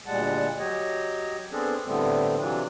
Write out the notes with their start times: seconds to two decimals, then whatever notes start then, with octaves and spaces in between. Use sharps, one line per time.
0.07 D2 A#2 G3 G#3 F#5 A5
0.58 F#3 G4 C#5 D#5
1.52 B3 C4 D4 G#4 A4
1.86 A2 D3 G3 A3 B3 C4
2.39 C3 E3 F#3 D4 F4